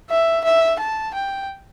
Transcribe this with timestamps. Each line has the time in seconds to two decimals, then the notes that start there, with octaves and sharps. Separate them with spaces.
0.09 E5
0.44 E5
0.79 A5
1.14 G5